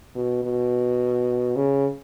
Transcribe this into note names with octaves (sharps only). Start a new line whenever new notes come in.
B2
B2
C#3